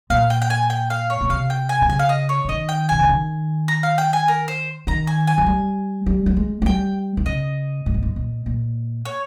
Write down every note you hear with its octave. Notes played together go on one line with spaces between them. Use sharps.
A#2 F5
G5
G5
G#5
G5
F5
C#5
A#2
C3 F5
G5
G#5
C3
C#3 G#5
F5
D#5
C#5
C#3
D#3 D#5
G5
C3 G#5
C#3
D#3
A#5
F5
G5
G#5
A#4
C5
D#3 A#5
G#5
G#5
F3
G3
G3
G3
G#3
G#3
G3 G5
D#3
C#3 D#5
G#2
A#2
G#2
A#2
A#2
C#5